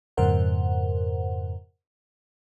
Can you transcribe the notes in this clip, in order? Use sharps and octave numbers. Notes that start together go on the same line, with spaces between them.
F2 G#2 C#3 A#4 C5 F#5